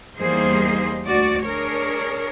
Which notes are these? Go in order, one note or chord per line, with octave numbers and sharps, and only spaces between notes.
E2 G3 A#3 D#4 G#4 C5
D2 F#4 D5
D4 G#4 A#4 C#5